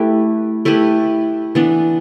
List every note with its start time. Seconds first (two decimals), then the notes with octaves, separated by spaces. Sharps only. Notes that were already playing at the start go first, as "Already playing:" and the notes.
Already playing: A3 E4 G4 B4
0.65 A3 E4 G4 B4
1.55 E3 B3 D4